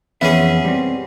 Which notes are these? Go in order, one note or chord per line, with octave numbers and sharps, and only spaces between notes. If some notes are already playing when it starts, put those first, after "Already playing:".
F2 E3 B3 C#4 G#4 E5
G3 C4